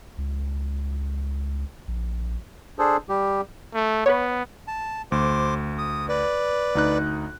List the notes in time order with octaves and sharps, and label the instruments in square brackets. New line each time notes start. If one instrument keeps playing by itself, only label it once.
[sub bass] C#2
A#1
[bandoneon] D4 G#4 A4 C5
G3 G4
[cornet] A3
[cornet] B3 [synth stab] B4 C#5
[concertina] A5
[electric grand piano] D2 [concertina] C5 D6
[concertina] D#6
B4 D5
[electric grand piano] D2 D#4 F#6